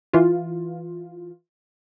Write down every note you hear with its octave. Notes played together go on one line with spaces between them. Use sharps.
E3 F4